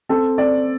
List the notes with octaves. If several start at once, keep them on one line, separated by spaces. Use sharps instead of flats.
C4 A4
C4 D5